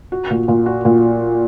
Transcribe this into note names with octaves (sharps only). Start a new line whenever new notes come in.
F#4
A#2
A#2
F#4
A#2